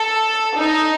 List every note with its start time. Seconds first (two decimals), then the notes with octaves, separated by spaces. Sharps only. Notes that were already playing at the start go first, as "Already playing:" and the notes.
Already playing: A4
0.56 D#4